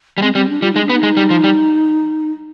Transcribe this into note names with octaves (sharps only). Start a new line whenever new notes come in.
G3
G#3 C4
G3 C4
D4
G3 F4
G#3 D#4
D4
B3
D#4
G#3
G3
F3
G3